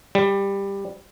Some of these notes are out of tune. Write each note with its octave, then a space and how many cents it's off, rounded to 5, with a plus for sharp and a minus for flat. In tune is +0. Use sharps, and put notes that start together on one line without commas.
G3 +15